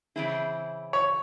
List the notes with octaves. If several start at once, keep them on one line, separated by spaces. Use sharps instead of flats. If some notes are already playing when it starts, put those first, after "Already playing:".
C#3 E3 C4 E4 G#4
C#5